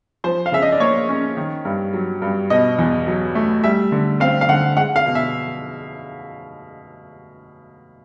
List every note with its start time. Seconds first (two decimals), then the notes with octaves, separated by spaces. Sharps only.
0.24 F3 C5
0.46 F5
0.52 C#3 E5
0.62 D#5
0.72 D5
0.80 A#3 C#5
1.09 C#4
1.37 D#3
1.65 G2
1.93 F#3
2.22 G2
2.50 B2 D#5
2.79 E2
3.07 F#3
3.35 A3
3.64 G3 E5
3.92 D3
4.20 C4 F5
4.41 F5
4.49 D3 F#5
4.77 G#3 F#5
4.96 F5
5.05 B2
5.15 E5